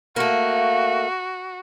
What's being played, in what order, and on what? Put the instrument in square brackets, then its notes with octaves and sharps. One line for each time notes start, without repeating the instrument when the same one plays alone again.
[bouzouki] A3 A#3 [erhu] F#4